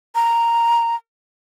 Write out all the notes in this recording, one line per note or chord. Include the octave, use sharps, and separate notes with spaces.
A#5